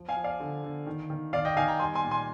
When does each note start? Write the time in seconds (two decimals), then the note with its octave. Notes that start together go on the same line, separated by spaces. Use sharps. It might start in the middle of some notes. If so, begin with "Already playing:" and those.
Already playing: F3
0.09 F5 G#5
0.17 F3
0.24 D5 F5
0.40 D3
0.64 D3
0.87 D#3
1.10 D#3
1.33 D#3 D5 F5
1.45 D#5 G5
1.57 D#3 F5 G#5
1.68 G5 A#5
1.80 G3 G#5 C6
1.95 G#5 C6
2.03 A#2
2.11 G#5 C6